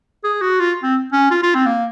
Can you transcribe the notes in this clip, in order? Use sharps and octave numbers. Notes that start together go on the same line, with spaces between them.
G#4
F#4
F4
C4
C#4
F4
F4
C4
A#3